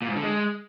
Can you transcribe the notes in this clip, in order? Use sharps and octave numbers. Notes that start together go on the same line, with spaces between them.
A#2
G#2
D3
G#3